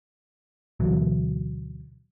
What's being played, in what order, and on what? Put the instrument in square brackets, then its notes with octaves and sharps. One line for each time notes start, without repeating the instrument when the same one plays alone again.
[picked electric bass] D2 B2 E3 F#3